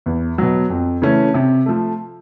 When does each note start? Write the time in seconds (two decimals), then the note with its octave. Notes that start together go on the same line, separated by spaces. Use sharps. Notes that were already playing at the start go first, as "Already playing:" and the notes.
0.06 E2
0.38 B2 F#3
0.70 F2
1.02 C#3 E3 A3 C#4
1.34 C3
1.66 F3 A3